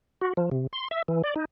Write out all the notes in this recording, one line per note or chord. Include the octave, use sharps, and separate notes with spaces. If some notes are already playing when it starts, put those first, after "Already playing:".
F#4
F3
C3
C6
E5
E3
D5
D#4